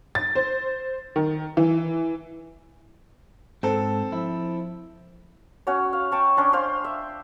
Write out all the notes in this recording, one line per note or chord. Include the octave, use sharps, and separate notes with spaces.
A6
C5
D#3
E3
G#2 C4 A4 A5
F3 E4
C#4 F#4 C#5
F5
G5 A5 C#6
C#4 D4 C6
C5 F5 C6
E5